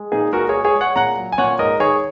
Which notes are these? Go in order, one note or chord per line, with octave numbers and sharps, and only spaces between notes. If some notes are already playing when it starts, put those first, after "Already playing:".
Already playing: G#3
A#2 D#4 G#4
G#3 F#4 A#4
G#3 G#4 C#5
G#4 C#5
G#3
C#5 F#5
A#2 F#5 A#5
F#3
G#5
A#2 C#5 F#5
G#2 A#4 D#5
D#3 G#4 C#5